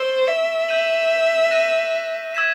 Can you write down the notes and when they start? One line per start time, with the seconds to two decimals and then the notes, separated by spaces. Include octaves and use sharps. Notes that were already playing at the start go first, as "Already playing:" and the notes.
Already playing: C5 C#6 E6 A6 D7 G7
0.27 E5
0.68 G6 B6 D#7 F#7
1.51 F#6 A#6 D#7
2.35 E6 G#6 B6 E7